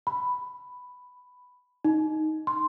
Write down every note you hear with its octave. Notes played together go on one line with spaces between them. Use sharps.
B5
D#4
C6